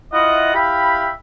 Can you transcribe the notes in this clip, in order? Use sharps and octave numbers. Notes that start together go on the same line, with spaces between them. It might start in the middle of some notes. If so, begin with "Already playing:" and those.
E4 F4 D#5 F#5
E4 G4 E5 F5 G5 B5